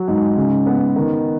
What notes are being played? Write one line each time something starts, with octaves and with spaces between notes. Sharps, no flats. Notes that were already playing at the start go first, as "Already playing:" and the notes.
Already playing: F#3
G#2
C#3
B3
D#3